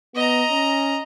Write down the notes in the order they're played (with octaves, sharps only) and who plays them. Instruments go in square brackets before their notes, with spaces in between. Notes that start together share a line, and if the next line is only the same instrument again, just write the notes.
[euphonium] B3 [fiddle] D#5 A#5
[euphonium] C#4